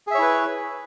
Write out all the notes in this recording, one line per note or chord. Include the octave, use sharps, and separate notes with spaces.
E4 G#4 B4 C#5 E5